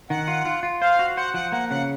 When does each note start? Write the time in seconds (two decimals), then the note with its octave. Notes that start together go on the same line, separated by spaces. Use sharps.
0.10 D#3 F#5
0.28 F4
0.45 F4
0.63 F4
0.81 C5 F5
0.99 F#4
1.17 C5 F#5
1.34 F3 F#5
1.52 A#3 F#5
1.70 C#3 F#5